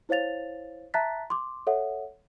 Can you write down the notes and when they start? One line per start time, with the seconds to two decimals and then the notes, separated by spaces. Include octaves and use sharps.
0.09 E4 C5 C#5 F5 A6 F7
0.94 E5 A5 A#5 F#6 A6 B6
1.30 C6 D6
1.67 A4 C#5 E5 F#5